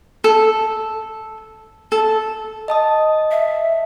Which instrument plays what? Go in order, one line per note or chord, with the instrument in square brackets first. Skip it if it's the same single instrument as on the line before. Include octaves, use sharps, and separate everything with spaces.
[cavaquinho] A4
A4
[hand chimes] D#5 A5 D#6
[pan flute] E5